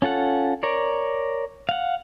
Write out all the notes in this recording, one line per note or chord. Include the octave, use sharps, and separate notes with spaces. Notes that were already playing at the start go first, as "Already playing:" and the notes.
C#4 F4 A4 F#5
A#4 C#5 D5
F5 F#5